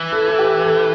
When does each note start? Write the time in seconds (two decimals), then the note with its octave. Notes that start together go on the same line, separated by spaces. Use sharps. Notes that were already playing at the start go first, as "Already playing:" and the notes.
Already playing: E3
0.12 A4
0.28 A4
0.39 G4
0.65 A4